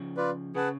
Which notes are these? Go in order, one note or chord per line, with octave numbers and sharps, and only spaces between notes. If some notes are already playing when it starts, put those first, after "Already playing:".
Already playing: C#3 F3
F4 B4 D5
C#3 G#4 B4 F#5 A5